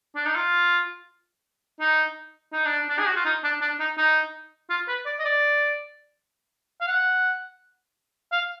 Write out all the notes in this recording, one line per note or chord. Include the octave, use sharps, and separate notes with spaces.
D4
D#4
F4
D#4
D#4
D4
D4
G#4
F#4
F4
D#4
D4
D4
D#4
D#4
F4
B4
D5
D#5
D5
F5
F#5
F5